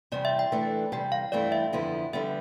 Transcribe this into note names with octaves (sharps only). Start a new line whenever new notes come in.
E2 C3 G3 C4 D5
E5
G5
E3 A3 D4 A4
E2 C3 G3 G5
F5
G2 E3 A3 C4 E4 D5
E5
F2 D3 F3 B3 E4
D3 G3 B3 E5